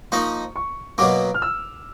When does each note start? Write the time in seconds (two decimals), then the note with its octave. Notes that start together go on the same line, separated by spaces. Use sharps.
0.12 F3 A#3 D#4 C#6
0.56 C#6
0.98 B2 F#3 A#3 D6
1.34 F6
1.42 E6